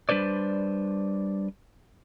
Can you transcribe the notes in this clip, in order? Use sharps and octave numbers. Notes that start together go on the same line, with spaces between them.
G3 D4 B4 C5 D5